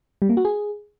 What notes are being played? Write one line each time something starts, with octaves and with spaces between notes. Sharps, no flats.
G3
A#3
F#4
G#4